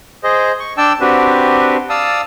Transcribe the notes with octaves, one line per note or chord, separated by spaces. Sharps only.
G#4 C5 D#5
C#6
D4 D5 G5 A5 E6
C4 D4 F#4 G4 B4
D5 F5 A5 D#6 E6